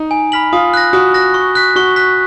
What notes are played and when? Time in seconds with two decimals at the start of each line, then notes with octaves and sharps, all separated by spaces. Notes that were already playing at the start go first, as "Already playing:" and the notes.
Already playing: D#4
0.11 G#5
0.32 B5 F6 B6 F#7
0.53 F4 D#6
0.74 F#6 A#6
0.93 F#4 D#6
1.14 F#6 A#6
1.34 C#6
1.55 F#6 B6
1.76 F#4 C#6
1.96 F#6 B6